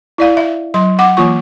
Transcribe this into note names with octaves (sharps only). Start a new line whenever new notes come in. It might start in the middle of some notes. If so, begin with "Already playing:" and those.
E4 D5 F5
E5
F#3 C6
F#5 D6
E3 A#3 F4 C#6